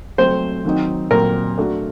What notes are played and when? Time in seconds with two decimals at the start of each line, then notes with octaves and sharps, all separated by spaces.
0.18 F#3 A3 C4 C5
0.65 D#3 F#3 C4 D#4
1.11 A#2 F#3 C4 A#4
1.58 A3 D4 F#4 A4